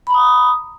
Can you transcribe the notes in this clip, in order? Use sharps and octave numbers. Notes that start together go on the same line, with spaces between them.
A#5 B5 D#6